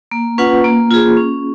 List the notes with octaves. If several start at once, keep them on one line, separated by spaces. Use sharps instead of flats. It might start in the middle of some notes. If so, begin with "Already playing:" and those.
A#3
C#4 F4 B4 F#5
A#3
F4 G#4
C#4